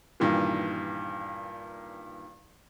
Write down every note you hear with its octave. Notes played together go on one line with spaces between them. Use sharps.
G2 A#2 D#3 E3